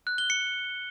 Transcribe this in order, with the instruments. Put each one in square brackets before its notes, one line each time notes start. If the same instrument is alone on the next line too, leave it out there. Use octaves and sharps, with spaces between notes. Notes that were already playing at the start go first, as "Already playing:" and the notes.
[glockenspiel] F#6
G7
C#7